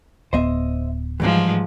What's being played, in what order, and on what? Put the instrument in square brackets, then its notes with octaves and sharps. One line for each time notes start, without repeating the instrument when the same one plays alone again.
[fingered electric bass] D1 B3 [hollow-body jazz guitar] C5 D#5 E5
[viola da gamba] G#2 F3 [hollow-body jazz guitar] E3 G3